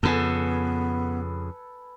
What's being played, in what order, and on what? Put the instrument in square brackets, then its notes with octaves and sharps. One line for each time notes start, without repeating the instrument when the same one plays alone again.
[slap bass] F2 C#3 [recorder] B3 [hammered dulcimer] A4 B4 G#5